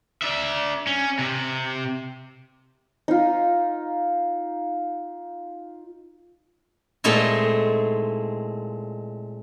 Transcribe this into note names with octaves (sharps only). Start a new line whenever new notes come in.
D4 E5
C#4
C3
D#4 F4
A#2 G#3 A3 C4 D#4 E4